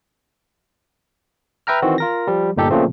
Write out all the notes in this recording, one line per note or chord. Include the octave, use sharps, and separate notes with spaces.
B4 E5 G5 A#5 F6
D#3 E3 C4 F#4
F4 A#4 A#6
F3 G3
G1 A#2 D#4 G4 A4
A#2 C#3 F3 A3 C4